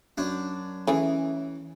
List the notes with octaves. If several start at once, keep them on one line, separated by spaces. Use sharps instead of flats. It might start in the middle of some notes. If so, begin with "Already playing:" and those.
F#2 D4
E3 A3 C#4 E4 G#4